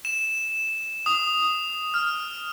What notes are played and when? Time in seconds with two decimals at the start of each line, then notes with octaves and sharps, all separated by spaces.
0.05 E7
1.06 D#6
1.94 F6